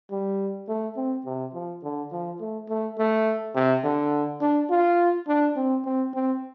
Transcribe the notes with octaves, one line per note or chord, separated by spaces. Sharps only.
G3
A3
C4
C3
F3
D3
F3
A3
A3
A3
C3
D3
D4
F4
D4
C4
C4
C4